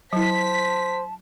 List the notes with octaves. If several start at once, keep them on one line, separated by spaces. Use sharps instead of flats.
F#3 E4 C5 A5 B6